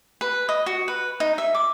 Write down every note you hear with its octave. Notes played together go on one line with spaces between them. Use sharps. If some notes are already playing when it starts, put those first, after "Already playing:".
B4
D#5
F#4
B4
D#4
E5
D6